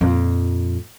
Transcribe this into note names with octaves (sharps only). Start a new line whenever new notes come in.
F2 A#2